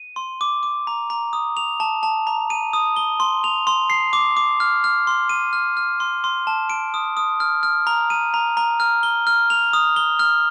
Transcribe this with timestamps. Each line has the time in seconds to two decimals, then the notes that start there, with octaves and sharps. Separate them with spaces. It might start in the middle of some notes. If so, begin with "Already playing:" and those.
Already playing: D#7
0.16 C6
0.41 D6
0.63 D6
0.87 A#5
1.10 A#5
1.33 D#6
1.57 F7
1.80 A5
2.03 A5
2.27 A#5
2.50 D#7
2.73 D#6
2.96 G7
3.20 C6
3.44 F7
3.67 C6
3.90 C7
4.13 D6
4.37 D6
4.60 F6
4.84 F6
5.07 C6
5.29 D#7
5.53 F6
5.77 F6
6.00 C6
6.24 C6
6.47 A5
6.70 D7
6.94 D#6
7.17 D#6
7.40 F6
7.63 F6
7.87 A#5
8.10 D#7
8.34 A#5
8.57 A#5
8.80 F6
9.03 G7
9.27 F6
9.50 F7
9.73 D#6
9.96 G7
10.19 F6